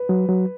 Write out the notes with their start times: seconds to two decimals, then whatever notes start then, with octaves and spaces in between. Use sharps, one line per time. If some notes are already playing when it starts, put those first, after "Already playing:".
Already playing: B4
0.09 F#3
0.28 F#3